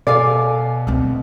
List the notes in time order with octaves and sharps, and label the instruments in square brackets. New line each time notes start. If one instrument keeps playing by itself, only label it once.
[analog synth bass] B2 [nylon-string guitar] A4 F5 G#5 [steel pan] D5
[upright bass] D2 C4